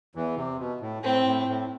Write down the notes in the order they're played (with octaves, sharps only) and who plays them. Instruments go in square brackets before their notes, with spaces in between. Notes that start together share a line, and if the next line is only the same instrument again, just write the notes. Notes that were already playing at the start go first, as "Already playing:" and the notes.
[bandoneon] E2 E3
C3
B2
A2
[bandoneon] A2 [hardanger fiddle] C4
[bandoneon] A2
A2